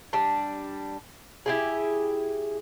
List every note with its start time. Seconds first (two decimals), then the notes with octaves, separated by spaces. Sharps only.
0.13 G3 D4
1.46 E4 G4 G#4